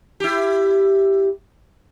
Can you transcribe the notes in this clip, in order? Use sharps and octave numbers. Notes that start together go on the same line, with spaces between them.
E4 G4